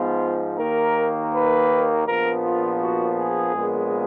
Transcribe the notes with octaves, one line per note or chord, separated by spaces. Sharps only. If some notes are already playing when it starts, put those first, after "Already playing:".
Already playing: G#2 F3 B3 F4
D#2 D#3 A#3 A#4
B4
A#1 A#2 F3 B3 A#4
F4
F#4
G#4
A#1 A#2 G#3 B3